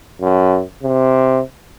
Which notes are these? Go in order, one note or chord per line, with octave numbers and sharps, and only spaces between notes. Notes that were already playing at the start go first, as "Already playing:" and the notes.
F#2
C3